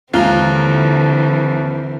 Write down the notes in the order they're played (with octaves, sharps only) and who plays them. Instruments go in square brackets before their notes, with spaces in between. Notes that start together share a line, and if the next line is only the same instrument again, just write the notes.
[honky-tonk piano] D#2 A#5 [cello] D3 E3 [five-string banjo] G#3 F4 [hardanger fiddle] C4